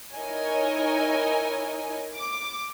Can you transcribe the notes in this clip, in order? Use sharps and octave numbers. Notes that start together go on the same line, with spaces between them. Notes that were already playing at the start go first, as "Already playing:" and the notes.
D#4 E4 A#4 C#5 D#5 G#5
D6